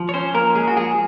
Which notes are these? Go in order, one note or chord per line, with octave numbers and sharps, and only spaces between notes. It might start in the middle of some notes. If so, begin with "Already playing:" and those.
Already playing: F3
C#5
C#4 C5
A#3 A#4
G#3 G#4
F#4
F3 G#4